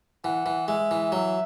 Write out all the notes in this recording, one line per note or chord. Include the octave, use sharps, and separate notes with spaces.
E3 F#5
E3
G#3 E5
E3
F#3 E5